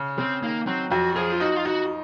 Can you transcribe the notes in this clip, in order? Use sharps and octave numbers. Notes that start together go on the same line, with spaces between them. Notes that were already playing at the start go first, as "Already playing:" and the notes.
Already playing: C#3
C#3 C4
D#3 A#3
F#3 C4
F2 F#4
F3 G#4
F4
D#4 F#4
F4
D#4 F#4